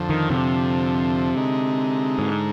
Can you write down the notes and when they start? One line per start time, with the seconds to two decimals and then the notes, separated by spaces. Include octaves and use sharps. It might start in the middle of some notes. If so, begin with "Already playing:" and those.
Already playing: F2 D3 F3
0.10 D#3
0.30 C3
1.34 D3 G#3 D#4
2.19 G#2